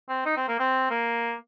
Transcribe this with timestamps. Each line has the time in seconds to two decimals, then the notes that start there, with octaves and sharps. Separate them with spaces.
0.09 C4
0.25 D#4
0.37 C4
0.48 A#3
0.60 C4
0.90 A#3